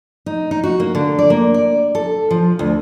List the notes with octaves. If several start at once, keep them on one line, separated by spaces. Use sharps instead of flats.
D#4
D#4
F#4
A#3
D3
D5
A#3
D5
A4
F3
D2